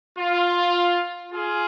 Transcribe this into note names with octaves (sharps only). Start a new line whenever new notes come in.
F4
F4 G#4